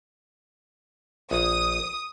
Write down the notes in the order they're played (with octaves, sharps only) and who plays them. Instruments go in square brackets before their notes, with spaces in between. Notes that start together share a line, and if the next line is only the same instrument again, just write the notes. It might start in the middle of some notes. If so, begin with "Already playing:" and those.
[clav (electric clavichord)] A#1 [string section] D#6